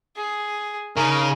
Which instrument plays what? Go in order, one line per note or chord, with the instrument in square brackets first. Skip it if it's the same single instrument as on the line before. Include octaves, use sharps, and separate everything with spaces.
[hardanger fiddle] G#4
[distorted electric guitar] C#3 C#4 [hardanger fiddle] D#4 [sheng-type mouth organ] A#4